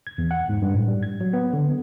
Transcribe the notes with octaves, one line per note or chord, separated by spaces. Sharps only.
G#6
E2
F#5
G#2
G2
A2
G3
G#6
F#3
B3
D3
B3